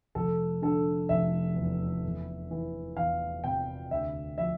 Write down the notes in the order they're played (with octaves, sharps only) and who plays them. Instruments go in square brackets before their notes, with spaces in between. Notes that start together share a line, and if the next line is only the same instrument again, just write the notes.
[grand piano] F1 A4
D3 A4
F1 E5
E2
E2
E3
E2 F5
C3 G5
D2 E5
F3 E5